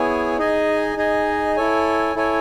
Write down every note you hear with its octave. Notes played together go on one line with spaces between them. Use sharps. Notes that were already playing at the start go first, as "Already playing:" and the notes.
Already playing: B3 E4 G#4 C#5 G#5
D#4 G#4 D#5 G#5
D#4 G#4 D#5 G#5
E4 A4 C#5 G#5
E4 A4 C#5 G#5